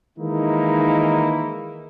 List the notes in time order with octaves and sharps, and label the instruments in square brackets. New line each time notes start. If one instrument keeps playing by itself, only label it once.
[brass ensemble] D#3 E3 G#3 A#3 D#4 E4